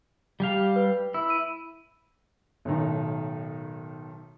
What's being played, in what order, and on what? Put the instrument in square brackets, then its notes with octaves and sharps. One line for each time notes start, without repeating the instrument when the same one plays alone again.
[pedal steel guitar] G3 G4 F5
[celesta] B4
[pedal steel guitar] E4 [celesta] E6
[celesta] E6 D#7
[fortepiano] B1 A2 D#3